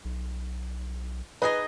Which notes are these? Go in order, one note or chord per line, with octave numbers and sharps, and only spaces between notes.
B1
D#4 G#4 B4 D#5